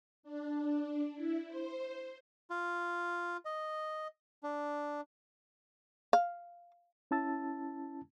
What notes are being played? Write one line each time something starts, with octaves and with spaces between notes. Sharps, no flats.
D4
E4
C5
F4
D#5
D4
F5
C#4 E4 A5 E6 A6